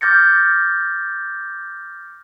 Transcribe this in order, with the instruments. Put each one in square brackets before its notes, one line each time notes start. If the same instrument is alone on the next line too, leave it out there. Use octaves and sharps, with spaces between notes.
[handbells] D6 F6 G6 A6 A#6 C#7